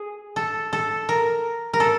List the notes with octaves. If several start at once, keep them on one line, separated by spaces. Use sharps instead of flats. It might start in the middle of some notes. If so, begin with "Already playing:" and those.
Already playing: G#4
A4
A4
A#4
A#4
A4